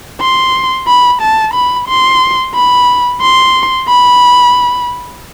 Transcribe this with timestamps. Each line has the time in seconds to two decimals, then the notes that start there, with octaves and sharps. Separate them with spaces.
0.21 C6
0.87 B5
1.21 A5
1.54 B5
1.88 C6
2.54 B5
3.21 C6
3.88 B5